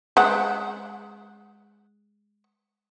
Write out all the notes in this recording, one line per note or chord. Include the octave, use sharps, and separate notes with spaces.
G#3 F#5